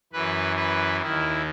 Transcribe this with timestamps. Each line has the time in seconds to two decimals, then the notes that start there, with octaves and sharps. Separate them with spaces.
0.13 F#2 E3 B4
0.57 B4
1.01 D#2 D#3 E4